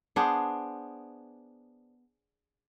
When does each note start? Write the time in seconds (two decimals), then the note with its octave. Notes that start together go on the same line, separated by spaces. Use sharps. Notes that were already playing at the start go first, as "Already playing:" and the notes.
0.16 B3 D4 G#4 C5